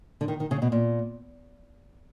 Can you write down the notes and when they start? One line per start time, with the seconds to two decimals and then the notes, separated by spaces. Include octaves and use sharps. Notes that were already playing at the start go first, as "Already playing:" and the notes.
0.21 D3
0.28 D#3
0.40 D#3
0.51 C#3
0.62 B2
0.72 A#2